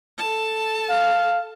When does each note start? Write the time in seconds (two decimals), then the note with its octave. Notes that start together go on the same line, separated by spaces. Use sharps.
0.18 A4 A5
0.90 F5